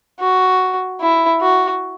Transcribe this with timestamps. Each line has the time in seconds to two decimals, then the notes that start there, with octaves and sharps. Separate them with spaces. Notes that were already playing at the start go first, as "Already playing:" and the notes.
0.20 F#4
1.01 E4
1.41 F#4